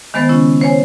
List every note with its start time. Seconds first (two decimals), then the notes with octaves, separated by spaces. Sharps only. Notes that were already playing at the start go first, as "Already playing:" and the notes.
0.14 D#3 G#3 B3 C5 A6
0.29 C#3 C#4 E4
0.61 C5 C#5 G#5